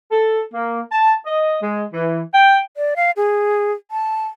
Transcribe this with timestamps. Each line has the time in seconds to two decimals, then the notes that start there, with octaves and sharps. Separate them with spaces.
0.11 A4
0.54 A#3
0.92 A5
1.26 D#5
1.63 G#3
1.94 E3
2.34 G5
2.77 D5
2.96 F5
3.17 G#4
3.91 A5